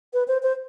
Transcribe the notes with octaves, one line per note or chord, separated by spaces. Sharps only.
B4
C5
C5